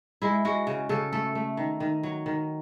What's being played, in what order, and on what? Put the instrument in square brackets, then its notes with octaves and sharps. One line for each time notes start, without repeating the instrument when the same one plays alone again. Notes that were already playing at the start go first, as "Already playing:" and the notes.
[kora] G#3 E4
G#3 F#4
C#3
C#3 A4
A3 A4
A3
D#3
D#3
F#3
D#3